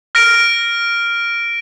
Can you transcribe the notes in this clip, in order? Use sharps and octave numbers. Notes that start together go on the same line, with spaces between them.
F6 A#6 D7